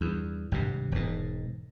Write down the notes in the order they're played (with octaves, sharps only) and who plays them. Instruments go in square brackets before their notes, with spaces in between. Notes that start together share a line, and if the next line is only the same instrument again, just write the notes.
[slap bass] E2 G2
G#1 G2 C3
E1 G#2